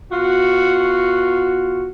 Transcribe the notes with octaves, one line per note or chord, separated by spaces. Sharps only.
B2 F4 F#4